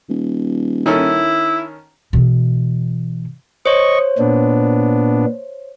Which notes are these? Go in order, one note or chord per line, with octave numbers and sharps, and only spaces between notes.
D#1
D#3 C#4 E4 A4
B2 E3
C5 C#5 D#5 C#6
A#2 B3 D4